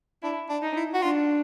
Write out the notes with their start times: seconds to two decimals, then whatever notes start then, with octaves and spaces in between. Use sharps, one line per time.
0.23 D4 E4
0.49 D4
0.62 D#4
0.76 E4
0.94 F#4
1.02 D4 F4